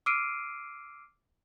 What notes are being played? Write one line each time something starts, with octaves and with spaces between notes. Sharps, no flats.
D6 E6 F6 C7 D7 D#7